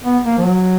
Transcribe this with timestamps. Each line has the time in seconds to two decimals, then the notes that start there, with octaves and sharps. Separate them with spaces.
0.04 B3
0.25 A#3
0.38 F3
0.46 F#3